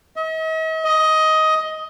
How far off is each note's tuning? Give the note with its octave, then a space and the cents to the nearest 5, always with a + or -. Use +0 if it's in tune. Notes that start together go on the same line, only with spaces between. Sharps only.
D#5 +45
D#5 +15